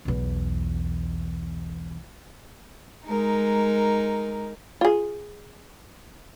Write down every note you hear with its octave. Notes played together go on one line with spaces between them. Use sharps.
B1 E2
G#3 D#4 A#4
F4 G#4